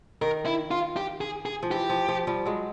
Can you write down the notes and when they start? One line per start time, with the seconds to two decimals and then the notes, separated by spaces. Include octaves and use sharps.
0.21 D#3 A#4
0.46 E4
0.71 F4
0.97 G4
1.21 G#4
1.46 G#4
1.63 F3
1.71 E3 G4
1.89 F3
2.08 F3
2.27 F3 G3
2.46 F#3 G#3